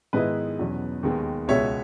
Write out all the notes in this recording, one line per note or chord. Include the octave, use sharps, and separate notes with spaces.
G#2 D#3 G#3 B3 E4 B4 D#5
E2 B2 F#3 C#4
D#2 D#3 G#3 B3
C#2 B2 G#3 B3 C#5 E5